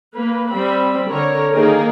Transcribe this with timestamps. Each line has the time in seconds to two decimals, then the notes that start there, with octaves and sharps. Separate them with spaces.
0.15 A#3 B4
0.51 G3 C4 B5
1.08 D3 A#4 C#5
1.52 D#3 A#3 D#4 G#4 A#4